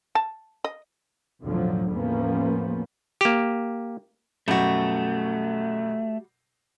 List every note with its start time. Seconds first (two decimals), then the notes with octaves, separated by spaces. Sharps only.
0.15 A5
0.64 D#5
1.44 B1 F2 A2 D3 F3 F#3
1.90 E2 A2 F3 A#3 B3 C#4
3.21 A#3 G4
4.48 F#2 B2 G3 A3 F#4 G6